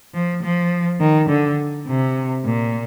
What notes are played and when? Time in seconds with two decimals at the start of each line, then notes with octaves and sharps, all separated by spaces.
0.14 F3
0.43 F3
1.01 D#3
1.29 D3
1.87 C3
2.45 A#2